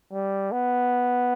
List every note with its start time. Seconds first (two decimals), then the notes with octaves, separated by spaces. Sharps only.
0.12 G3
0.52 B3